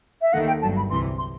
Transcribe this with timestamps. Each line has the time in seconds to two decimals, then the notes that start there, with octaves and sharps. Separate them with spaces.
0.21 E5
0.33 D#2 D#3 A3 F#5
0.47 G5
0.62 G1 G2 F#3 A5
0.76 B5
0.90 C2 C3 E3 C6
1.18 C6